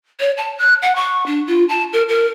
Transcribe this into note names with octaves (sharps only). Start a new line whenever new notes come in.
C#5
A5
F#6
F#5
C#6
D4
F4
A5
A#4
A#4